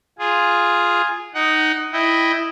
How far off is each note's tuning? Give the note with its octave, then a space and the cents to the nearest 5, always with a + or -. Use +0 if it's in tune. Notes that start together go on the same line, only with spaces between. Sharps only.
F4 +0 G#4 +0
D#4 +0 F#5 +25
E4 +0 D#5 +0 G5 -5